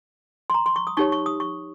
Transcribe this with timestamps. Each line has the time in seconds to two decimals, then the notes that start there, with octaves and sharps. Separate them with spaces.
0.50 C6
0.54 A#5
0.66 C6
0.76 C#6
0.87 D#6
0.97 D#4 G4 C#5 C#6
1.12 C#6
1.26 D#6
1.40 C#6